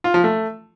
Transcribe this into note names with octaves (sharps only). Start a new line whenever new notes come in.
F4
F3
A3